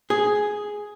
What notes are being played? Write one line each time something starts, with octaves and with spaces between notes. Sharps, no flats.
G#4